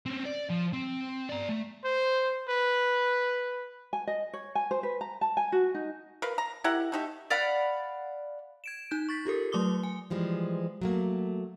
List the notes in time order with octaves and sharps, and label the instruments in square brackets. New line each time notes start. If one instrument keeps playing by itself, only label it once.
[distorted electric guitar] C4 C#4
D5
F3
C4
D5 A#5
A3
[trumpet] C5
B4
[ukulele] G#5
D#5
C#5
G#5
C5
B4
A#5
A5
G#5
F#4
D#4
[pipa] A#4 B4 F5
A#5
E4 G4 A#4 F#5
A3 D#4 G4
[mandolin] D5 F5 F#5 B5
[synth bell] G#6 D7 E7
D#4 G6
C#6 A6 B6
F4 G4 A4 A#4
F#3 A3 C6 D6 D#6 G7
G#5
[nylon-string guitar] E3 F3 G3 G#3
F#3 A3 A#3